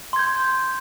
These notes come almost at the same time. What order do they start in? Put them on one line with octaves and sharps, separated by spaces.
C6 G#6 G6